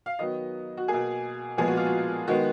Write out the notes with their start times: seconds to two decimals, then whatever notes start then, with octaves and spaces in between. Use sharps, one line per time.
0.06 F5
0.19 D#3 F#3 B3 D#5
0.77 F#4
0.88 B2 A#3 G#4
1.57 A#2 F3 G#3 B3 G#4
1.67 F#4
1.77 F4
1.86 F#4
2.28 D#3 G#3 B3 F#4